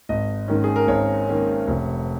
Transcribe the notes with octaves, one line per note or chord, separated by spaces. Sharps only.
G#1 D#5
G#2 D#3 A#3 C#4
G#4
A#4
G#1 C#5
G#2 D#3 A#3 C#4
F1